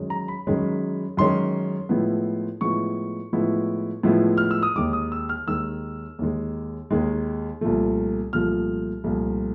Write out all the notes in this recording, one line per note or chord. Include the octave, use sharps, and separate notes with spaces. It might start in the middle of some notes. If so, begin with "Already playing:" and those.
Already playing: F#2 D#3 G#3 C#4
A#5
B5
F#2 D#3 G#3 C#4
F#2 D#3 G#3 C#4 C6
A2 F3 G#3 B3 E4
A2 F3 G#3 B3 E4 C#6
A2 F3 G#3 B3 E4
A2 F3 G#3 B3 E4
F6
E6
D#6
D#2 D#3 G#3 D6
D#6
E6
F6
D#2 D#3 G#3 E6
D#2 D#3 G#3
D#2 D#3 G#3
C2 A#2 F3 A3
C2 A#2 F3 A3 F6
C2 A#2 F3 A3